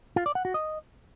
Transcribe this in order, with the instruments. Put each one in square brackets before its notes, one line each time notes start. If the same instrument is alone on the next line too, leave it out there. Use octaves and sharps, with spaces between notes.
[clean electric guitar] F4
D5
F#5
F#4
D#5